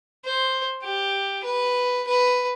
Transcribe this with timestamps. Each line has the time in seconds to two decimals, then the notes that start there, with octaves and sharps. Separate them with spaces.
0.25 C5
0.83 G4
1.44 B4
2.08 B4